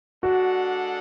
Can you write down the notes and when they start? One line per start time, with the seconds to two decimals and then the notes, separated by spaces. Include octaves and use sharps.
0.23 G#3 D4 F#4 A4 D5 F#5